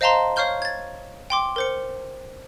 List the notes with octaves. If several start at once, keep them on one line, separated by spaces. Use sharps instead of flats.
C5 D#5 F5 A5 A#5 C6
C#5 F5 C#6 F6 G6 G7
G#6 A6
G5 C6 D6
A#4 C5 C#7